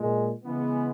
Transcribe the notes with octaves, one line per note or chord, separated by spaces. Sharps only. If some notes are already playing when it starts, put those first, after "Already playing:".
Already playing: A#2 G#3
C#3 E3 G#3 B3